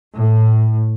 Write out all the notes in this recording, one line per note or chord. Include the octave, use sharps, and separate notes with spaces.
A2